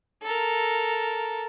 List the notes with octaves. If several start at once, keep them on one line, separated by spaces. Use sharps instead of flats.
A4 A#4